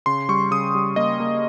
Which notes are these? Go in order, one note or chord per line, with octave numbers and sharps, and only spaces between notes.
C#3 C6
G3 C#6
C#3 D#6
G3
A#3 D#5
A#3